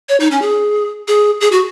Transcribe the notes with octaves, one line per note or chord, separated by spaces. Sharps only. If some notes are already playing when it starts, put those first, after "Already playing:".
C#5
D#4
C#4
G#4
G#4
G#4
F#4